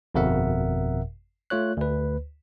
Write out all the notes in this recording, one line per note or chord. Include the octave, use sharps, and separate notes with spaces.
G1 F2 B2 A#4 E5 F#5
A3 F4 C#5 F#6
D2 B4